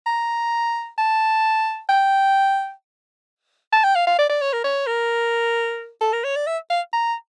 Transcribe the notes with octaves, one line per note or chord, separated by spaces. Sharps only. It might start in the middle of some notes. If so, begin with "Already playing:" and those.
A#5
A5
G5
A5
G5
F5
F5
D5
D5
C#5
A#4
C#5
A#4
A4
A#4
C#5
D5
E5
F5
A#5